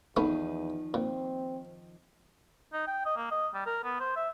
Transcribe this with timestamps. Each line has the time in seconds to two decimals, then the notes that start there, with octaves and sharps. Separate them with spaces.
0.17 E2 D#3 F3 A3 B3 C#4 D#4
0.94 A#2 C4
2.73 D#4
2.87 G5
3.06 D#5
3.17 A#3
3.31 D#5
3.54 G3
3.66 A#4
3.84 B3
4.00 C5
4.16 E5